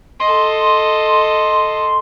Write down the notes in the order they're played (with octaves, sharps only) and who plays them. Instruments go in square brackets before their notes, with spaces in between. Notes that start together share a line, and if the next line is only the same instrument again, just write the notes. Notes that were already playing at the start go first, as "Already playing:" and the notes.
[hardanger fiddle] A4 D#5 [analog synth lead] C6